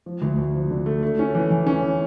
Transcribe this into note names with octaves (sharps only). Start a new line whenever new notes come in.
F3
D2
D2
F3
D3
A3
A3
C#4
E3
E3
C#4
E3